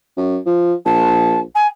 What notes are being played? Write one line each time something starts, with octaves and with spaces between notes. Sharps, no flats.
F#2
F3
A#1 A5
G#5